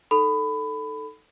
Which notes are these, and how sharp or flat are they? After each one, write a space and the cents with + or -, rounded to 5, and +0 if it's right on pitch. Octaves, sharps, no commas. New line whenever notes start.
D#4 +5 A4 +0 B5 +20